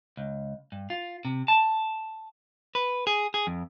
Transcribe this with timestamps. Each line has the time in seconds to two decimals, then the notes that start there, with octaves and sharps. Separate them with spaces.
0.17 C#2
0.72 G2
0.90 F4
1.25 C3
1.48 A5
2.75 B4
3.07 G#4
3.34 G#4
3.47 F2